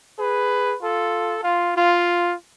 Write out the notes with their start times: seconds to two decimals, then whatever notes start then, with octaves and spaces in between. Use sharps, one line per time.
0.19 G#4 B4
0.82 F4 A4
1.44 F4
1.76 F4